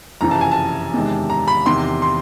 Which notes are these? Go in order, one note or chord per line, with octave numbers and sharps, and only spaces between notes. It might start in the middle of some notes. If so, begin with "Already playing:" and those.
F#1 F2 C3 E3 A#5
A5
G#5
A5
E2 C3 D#3 G#3
A#5
B5
E2 C3 D#3 C6
C6